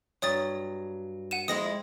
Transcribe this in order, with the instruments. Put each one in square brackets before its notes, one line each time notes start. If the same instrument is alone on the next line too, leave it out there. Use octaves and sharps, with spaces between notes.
[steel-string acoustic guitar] G2 F#3 [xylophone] C#5 D#6 A6
[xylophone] F#5 D#7 E7
[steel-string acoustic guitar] F2 G#3 E4 [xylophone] D#6 A#6